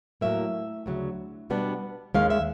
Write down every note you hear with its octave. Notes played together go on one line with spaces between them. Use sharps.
A2 F#3 A#3 E5
D2 C#3 F#3
B2 G3 B3 D4
D#2 D#3 G#3 C#4 F5
E5